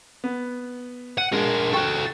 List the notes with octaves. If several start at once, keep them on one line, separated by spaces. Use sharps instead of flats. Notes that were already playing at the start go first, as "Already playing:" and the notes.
B3
F#5 D#7
G#3 D4 A#4
F#4 A4 G5 C#6